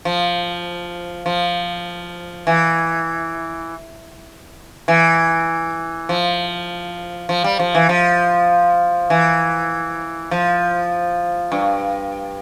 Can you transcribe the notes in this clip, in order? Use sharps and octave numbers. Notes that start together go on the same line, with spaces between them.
F3
F3
E3
E3
F3
F3
G3
F3
E3
F3
E3
F3
G2